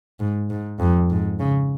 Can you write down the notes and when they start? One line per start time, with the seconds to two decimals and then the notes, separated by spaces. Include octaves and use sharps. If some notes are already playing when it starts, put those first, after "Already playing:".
0.20 G#2
0.50 G#2
0.80 F2
1.10 G#2
1.40 C#3